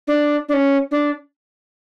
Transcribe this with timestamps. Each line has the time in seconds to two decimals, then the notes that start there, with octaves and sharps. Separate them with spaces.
0.07 D4
0.49 D4
0.53 C#4
0.91 D4